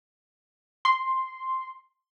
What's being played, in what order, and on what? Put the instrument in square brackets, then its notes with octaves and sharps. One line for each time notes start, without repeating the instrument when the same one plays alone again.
[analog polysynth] C6